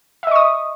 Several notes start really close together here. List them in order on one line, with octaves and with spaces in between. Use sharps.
E5 D#5 C#6 D#6